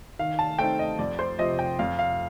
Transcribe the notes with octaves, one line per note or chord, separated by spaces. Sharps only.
D#3 F5
A5
A3 C4 D#4 G5
D#5
F2 D5
C5
C3 F3 C4 D#5
G5
F2 F5
F5